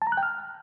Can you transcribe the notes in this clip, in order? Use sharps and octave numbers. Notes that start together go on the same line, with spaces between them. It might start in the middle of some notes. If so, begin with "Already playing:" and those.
A5
A#5
F#6
G5
F6